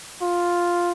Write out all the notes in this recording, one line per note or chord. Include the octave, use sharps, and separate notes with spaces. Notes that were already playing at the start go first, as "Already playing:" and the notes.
F4